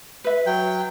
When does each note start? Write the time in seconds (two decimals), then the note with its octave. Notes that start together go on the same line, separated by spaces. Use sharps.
0.24 B4 E5
0.46 F#3 G5